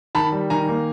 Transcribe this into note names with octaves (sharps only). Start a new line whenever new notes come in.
D#3 A5 B5
G3
D#3 G#5 A#5
A#3